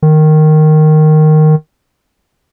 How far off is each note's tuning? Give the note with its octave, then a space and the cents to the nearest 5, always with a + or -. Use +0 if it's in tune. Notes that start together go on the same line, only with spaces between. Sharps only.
D#3 -10